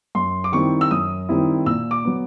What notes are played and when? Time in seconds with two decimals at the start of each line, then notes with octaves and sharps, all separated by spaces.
0.15 F#2 C6
0.44 D6
0.52 D#3 G3 C4 E4 C#6
0.81 E6
0.91 F#2 D#6
1.29 D#3 G3 C4 E4
1.66 A#2 E6
1.91 D6
2.05 F#3 B3